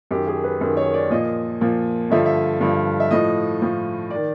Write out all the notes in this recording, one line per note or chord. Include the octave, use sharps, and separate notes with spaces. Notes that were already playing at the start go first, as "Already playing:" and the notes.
F#2 D#3 G4
G#4
B4
F#2 D#3
C#5
D5
A#2 F3 D#5
A#2 F3
G2 D3 F3 E5
E5
G2 D3 F3
E5
A2 F3 D#5
A2 F3
D#3 D5